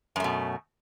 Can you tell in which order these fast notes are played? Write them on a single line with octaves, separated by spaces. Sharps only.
F#2 A3 B2